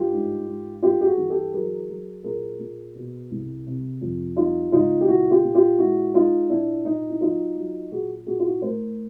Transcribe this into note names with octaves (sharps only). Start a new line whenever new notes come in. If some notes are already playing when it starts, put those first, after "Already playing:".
Already playing: G2 F4 G4
G#2
G#2
G2 F4 G4
G4
F#4 G#4
E3
G4 A4
F#3 G#4 A#4
F#3
A#2 G#4 A#4
A#2
B2
C2
C3
F2
G3 D#4 F4
C#2 D#4 F4
G4
A#2 E4 F#4
F4 G4
A#2
F4 G4
G#3 E4 F#4
G#3 D#4 F4
A#2 D4 E4
A#2 D#4
E4
F#3 D#4 F4
F#3
A#2 F#4 G#4
A#2 F#4 G#4
F4
E4 F#4
A2 A#4 C5